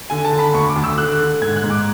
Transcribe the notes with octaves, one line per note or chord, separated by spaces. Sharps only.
D3 G#5
A5
D3
B5
D2 C#6
D6
D2
E6
D3 F#6
D3
G#2 G#6
F#6
G#2
D6